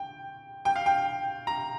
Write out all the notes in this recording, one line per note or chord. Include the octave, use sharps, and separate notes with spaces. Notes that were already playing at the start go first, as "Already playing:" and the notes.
Already playing: G5
G5
F5
G5
A#5